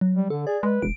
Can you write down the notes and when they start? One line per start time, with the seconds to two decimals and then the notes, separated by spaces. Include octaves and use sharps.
0.01 F#3
0.15 G3
0.30 D3 A4
0.47 G#4 D5
0.63 G#3 B4
0.82 E1 D7